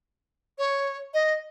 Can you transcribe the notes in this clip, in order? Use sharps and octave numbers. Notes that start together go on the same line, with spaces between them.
C#5
D#5